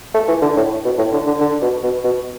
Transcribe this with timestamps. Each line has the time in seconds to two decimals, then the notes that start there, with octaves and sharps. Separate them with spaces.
0.14 A3
0.28 E3
0.42 D3
0.56 A2
0.85 B2
0.98 A2
1.13 D3
1.27 D3
1.41 D3
1.62 B2
1.83 B2
2.04 B2